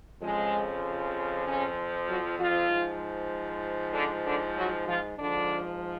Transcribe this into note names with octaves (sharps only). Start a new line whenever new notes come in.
F2 C#3 F3 G#3
C#3 C#4
F#3 F#4
F3 F4
G#2 F3
D3 D4
D3 D4
F#3 F#4
F3 F4
G#2 D3 F3 D4